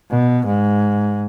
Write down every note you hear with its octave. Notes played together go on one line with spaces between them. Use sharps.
B2
G#2